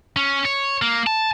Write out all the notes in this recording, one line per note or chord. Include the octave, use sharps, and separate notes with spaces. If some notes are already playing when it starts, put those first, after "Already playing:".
C#4
C#5
A#3
A5